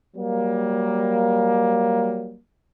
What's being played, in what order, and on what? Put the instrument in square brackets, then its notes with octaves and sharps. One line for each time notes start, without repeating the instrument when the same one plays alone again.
[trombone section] F#3 G3 A#3